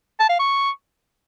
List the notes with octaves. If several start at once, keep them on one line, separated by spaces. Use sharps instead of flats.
A5
F5
C#6